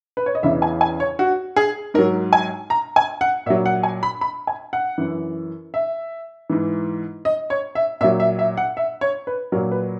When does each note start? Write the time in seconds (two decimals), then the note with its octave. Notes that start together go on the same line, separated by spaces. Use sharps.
0.17 B4
0.26 C#5
0.35 D#5
0.43 E2 C#3 E3 E5
0.62 G#5
0.81 G#5
1.00 C#5
1.19 F#4
1.56 G#4
1.94 G#2 F#3 A#4
2.33 G#5
2.70 A#5
2.96 G#5
3.21 F#5
3.46 A#2 E5
3.50 F#3
3.66 F#5
3.83 G#5
4.03 B5
4.21 B5
4.47 G#5
4.73 F#5
4.98 F#2 E3
5.74 E5
6.49 G#2 E3
7.25 D#5
7.50 C#5
7.75 E5
8.01 A#2 E5
8.04 F#3
8.20 E5
8.39 E5
8.57 F#5
8.77 E5
9.01 C#5
9.27 B4
9.52 F#3 A#4
9.55 A#2
9.72 B4